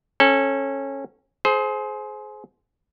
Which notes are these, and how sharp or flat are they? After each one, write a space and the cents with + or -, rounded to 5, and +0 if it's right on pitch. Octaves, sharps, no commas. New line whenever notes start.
C#4 -20 A4 +0
G#4 +30 C5 +0